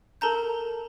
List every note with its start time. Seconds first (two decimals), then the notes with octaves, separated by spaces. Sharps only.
0.21 A4 A#4 A5 A#5 G6